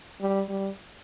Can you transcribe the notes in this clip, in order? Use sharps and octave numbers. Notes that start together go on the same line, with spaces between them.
G3
G3